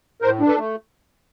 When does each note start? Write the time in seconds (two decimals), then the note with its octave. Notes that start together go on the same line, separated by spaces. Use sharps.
0.22 A2 A#4 C5
0.40 D4
0.48 A4 B4
0.57 A3